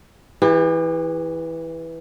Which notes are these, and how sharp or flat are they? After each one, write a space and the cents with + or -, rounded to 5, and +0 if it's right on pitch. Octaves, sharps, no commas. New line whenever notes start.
E3 -5 G4 +45